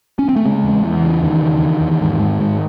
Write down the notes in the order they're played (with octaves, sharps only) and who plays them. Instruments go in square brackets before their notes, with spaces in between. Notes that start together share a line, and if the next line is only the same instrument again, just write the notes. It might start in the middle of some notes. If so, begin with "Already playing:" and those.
[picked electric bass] C#4
C4
A3
C#3 G#3
E2
E2 E3
C#3
E2 D#3
C#3
E2
E2
G#2
G#2
G#2